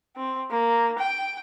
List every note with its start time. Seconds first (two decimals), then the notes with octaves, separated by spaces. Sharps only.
0.16 C4
0.51 A#3
0.98 G5